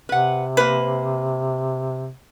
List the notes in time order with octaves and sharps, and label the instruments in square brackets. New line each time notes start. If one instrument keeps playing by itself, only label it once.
[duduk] C3 [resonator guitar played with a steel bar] B4 F#5
[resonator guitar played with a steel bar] A#3 C5 [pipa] B4